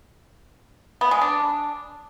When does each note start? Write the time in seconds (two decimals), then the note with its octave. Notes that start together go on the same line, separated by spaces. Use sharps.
1.01 B3
1.11 G#3
1.21 D4